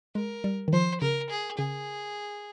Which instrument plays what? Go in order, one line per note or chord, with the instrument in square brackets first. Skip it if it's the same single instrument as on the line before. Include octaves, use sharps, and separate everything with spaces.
[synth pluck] G#3 [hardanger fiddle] A#4
[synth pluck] G3
D#3
[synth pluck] F3 [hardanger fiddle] C5
[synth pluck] C#3 [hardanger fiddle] A#4
[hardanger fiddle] G#4
[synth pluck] C#3 [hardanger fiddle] G#4